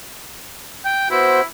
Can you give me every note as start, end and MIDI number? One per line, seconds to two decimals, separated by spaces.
0.85 1.08 79
1.11 1.41 59
1.11 1.43 64
1.11 1.41 66
1.11 1.41 72